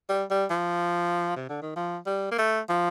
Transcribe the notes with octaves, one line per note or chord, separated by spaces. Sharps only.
G3
G3
F3
C3
D3
D#3
F3
G3
A#3
A3
F3